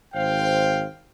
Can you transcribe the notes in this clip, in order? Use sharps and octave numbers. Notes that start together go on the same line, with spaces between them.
G#1 C5 F5 G5